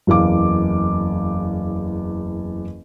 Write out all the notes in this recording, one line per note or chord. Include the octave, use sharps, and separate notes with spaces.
F#1 E2 F5 D6